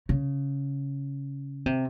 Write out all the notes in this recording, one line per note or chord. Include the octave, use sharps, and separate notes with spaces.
C#3
C3